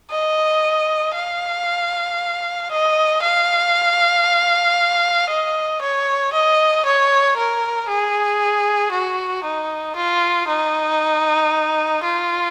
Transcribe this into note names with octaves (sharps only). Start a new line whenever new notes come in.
D#5
F5
D#5
F5
D#5
C#5
D#5
C#5
A#4
G#4
F#4
D#4
F4
D#4
F4